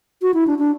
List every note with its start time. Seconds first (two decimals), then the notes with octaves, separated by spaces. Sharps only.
0.22 F#4
0.34 E4
0.47 D4
0.59 D4